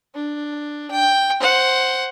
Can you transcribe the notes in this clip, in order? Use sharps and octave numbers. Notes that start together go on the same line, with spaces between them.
D4
G5
C5 F#5